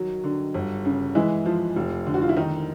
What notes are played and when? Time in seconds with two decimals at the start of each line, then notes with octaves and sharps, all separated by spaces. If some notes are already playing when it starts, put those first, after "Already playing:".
Already playing: D#3 F#3
0.23 D3
0.54 G1
0.85 C#3
1.15 E3 G#3 E4
1.46 F3
1.76 F1
2.06 D3
2.14 F#4
2.22 F4
2.29 E4
2.36 D#3 D#4